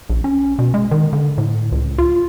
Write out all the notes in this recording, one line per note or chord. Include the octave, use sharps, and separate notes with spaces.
A#1
C#4
B2
G#3
D#3
D3
A2
C#2
F4